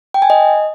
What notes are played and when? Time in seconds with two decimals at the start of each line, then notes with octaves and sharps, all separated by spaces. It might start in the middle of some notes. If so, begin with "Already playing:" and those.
0.14 G5
0.22 G#5
0.30 D#5